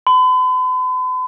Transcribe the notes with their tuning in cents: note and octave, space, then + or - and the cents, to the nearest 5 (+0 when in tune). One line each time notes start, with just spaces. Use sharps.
B5 +45